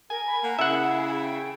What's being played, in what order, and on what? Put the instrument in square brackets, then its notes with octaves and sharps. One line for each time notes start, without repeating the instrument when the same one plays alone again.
[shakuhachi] A#4 [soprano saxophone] G#5
[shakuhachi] B5
[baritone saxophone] A#3 [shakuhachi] F#5
[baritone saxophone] C#3 [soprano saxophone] E4 [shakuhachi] G#4 [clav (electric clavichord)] E5 F#5
[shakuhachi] G5